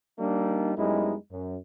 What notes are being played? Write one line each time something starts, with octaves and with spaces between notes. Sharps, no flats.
G3 A#3 D4 D#4
F#2 G3 G#3 B3 D#4 E4
F#2